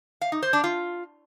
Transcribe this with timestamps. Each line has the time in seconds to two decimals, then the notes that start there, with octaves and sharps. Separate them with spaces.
0.21 F5
0.32 D#4
0.43 C5
0.53 D4
0.64 F4